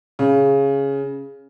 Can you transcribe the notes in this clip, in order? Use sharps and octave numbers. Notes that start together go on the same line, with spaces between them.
C#3